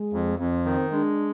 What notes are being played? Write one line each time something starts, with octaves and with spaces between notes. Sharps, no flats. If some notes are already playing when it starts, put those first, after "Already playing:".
Already playing: G#3
F2
F2 C4
D#3
G#3 D4